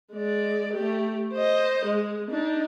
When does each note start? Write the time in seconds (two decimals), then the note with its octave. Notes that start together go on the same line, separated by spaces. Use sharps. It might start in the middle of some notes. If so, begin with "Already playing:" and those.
0.13 G#3 D5
0.73 A3 G4
1.33 C5 D#5
1.85 G#3
2.31 D4 D#4